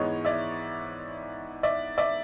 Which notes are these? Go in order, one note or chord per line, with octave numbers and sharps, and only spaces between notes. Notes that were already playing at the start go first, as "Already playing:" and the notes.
Already playing: G#2 E3 G#3 B3 C#5 D#5
D5 E5
D5 E5
D5 E5